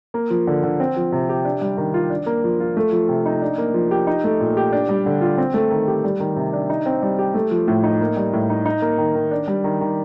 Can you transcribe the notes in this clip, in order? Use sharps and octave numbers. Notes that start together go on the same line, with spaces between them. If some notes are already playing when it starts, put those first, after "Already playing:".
A#3
F3
D3
D3
C4
F3
C3
G4
D4
G3
D#3
F4
D4
A#3
F3
F4
A3
F3
C3
D#4
D4
A#3
F3
G4
D#4
A3
A#2
G4
D4
G3
D3
F4
C4
A3
D#3
G4
G3
D#3
C3
D4
D#4
C4
G3
G4
A3
F3
A2
D#4
A#3
G3
A2
D#4
D#4
A#3
D#3
D#3
D4
G3
D#3
D#3